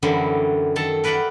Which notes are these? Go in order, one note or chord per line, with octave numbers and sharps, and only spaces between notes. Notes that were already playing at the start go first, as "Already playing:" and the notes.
F#2 D3 E3 F#3 G3
D#3 A4 A5 A#5
A#4 B4 D5 E5 F#5 G5